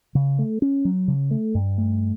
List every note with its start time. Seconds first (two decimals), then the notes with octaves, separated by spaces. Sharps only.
0.15 C#3
0.39 A3
0.62 C#4
0.85 F#3
1.08 C#3
1.31 A3
1.55 G2
1.78 A3